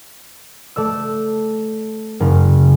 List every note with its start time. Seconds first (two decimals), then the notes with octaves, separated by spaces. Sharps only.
0.76 A3 D5 E6
2.20 F#1 C#3